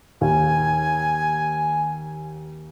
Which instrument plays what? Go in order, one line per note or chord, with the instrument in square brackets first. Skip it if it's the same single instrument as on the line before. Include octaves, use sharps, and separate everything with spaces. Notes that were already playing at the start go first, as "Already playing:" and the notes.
[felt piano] D#2 [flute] G#5